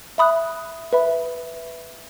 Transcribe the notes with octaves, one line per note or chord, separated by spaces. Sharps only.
E5 B5 D#6 F#6
B4 E5 B5